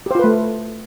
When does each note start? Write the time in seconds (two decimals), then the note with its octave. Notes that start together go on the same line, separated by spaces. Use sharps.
0.06 G4
0.11 C5
0.15 F4
0.19 B4
0.24 A3